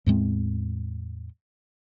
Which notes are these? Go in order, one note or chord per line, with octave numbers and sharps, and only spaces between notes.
E2 A2 G#3 C4